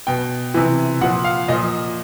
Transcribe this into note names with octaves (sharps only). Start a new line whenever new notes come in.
B2 G5
C3 E3
A#2 F3 F#5
F5
A#2 F3 D#5